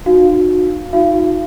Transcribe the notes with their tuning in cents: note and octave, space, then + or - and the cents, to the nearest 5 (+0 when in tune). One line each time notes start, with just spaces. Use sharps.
D#4 -35 F#4 -30 F5 +0
D#4 +15 F#4 -45 F5 -40